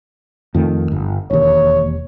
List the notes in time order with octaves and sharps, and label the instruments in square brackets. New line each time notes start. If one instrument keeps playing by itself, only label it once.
[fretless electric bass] F2 D#3 A3
G1
[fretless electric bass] E1 D#2 [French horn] C#5